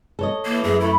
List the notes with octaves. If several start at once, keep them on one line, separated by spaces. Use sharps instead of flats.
A4 C#5 D#5
E3 A#3
F#2 G#4
A3 E4 B5